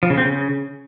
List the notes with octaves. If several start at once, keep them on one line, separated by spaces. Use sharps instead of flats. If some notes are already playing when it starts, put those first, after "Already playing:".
F3
C#3
C4
C#3